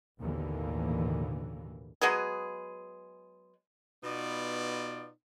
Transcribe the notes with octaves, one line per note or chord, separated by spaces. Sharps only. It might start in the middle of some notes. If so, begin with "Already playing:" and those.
A1 D#2 B2 D3 E3 A#3
F#3 G#3 B3 G#4
B2 B3 D#4 F4 D5